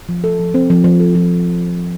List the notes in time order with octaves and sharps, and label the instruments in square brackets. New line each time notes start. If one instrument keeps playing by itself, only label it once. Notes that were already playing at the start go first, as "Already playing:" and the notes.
[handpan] F3
A4
F3
C4
F3
F3
A4
F3